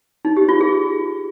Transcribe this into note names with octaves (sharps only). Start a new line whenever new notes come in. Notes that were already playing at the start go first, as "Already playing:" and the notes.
D#4
G4
F4
G#4